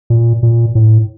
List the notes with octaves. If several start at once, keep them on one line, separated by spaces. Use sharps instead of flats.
A#2
A#2
A2